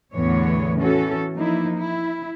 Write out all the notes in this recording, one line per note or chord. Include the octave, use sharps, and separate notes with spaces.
E2 A2 D3 E3 B3 C#5
E3 C#4 F#4 A4
F3 A#3 D#4 E4
E4